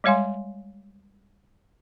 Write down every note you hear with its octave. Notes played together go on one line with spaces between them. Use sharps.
G3 G#3 C#5 F5 G#5 C6